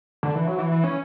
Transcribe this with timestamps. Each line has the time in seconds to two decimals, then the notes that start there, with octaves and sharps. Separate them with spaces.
0.23 D3
0.35 E3
0.47 F#3
0.59 E3
0.72 E3
0.84 C#4